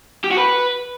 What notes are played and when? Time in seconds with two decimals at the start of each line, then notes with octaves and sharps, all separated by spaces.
0.24 G4
0.31 F#4
0.38 B4